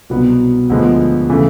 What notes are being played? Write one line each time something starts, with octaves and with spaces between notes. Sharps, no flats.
C2 B2 F#3 B3
D2 D3 F3 G#3 B3
C#3 E3 A3